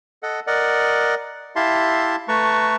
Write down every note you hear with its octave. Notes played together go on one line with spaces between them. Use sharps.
A4 D#5 F#5
A#4 D5 D#5 F#5
E4 G4 E5 F5 A5 C6
A3 B4 A5 A#5 C#6